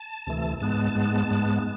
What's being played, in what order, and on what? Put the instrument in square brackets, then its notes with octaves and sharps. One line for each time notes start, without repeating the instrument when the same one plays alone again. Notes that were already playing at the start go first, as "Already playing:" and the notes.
Already playing: [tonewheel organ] A5
D2 C3 E3 A3
G#2 G#3 B3 A5
G#2 G#3 B3
G#2 G#3 B3